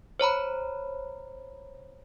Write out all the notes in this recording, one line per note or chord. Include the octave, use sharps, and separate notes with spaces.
C5 C#5 A#5 B5